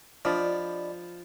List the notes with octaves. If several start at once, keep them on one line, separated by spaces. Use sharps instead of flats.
F3 D4 G4 D5 D#5 B5